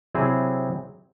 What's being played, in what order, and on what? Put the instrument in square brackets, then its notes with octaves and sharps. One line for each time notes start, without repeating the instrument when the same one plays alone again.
[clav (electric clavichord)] C3 F#3 C4 E4 G#4